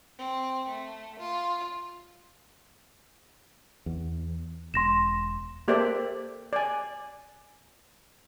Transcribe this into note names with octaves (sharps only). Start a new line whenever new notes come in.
C4
A3
F4
E2
E1 C6 A#6 E7
A#3 G4 A4 C5 D5 E5
D5 G#5